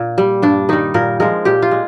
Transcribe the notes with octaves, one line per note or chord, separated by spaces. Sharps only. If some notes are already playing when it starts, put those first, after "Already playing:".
Already playing: A#2
G3
G2 D4
D#3 G3 D#4
A#2 A#4
F3 G#3 A#4
A#2 G4
F4
G#3